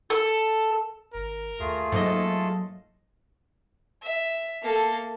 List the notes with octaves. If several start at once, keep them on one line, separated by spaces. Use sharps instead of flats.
A4
G#1 A#4
D#2 A3 F4 G#4
G#2 F#3 A#3 A4 D#5
E5
A#3 A4